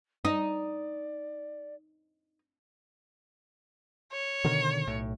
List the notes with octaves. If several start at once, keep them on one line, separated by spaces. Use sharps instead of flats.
D#4 D5
C#5
B2 D3 D#3
B1 A2